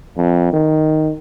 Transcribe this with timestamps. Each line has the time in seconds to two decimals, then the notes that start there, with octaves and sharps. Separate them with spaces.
0.17 F2
0.53 D#3